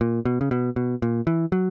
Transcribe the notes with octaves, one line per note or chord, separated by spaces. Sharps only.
A#2
B2
C#3
B2
B2
A#2
E3
F#3